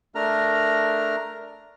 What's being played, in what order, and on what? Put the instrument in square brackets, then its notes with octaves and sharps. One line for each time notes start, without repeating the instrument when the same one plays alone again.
[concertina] A3 D4 A#4 A#5 F6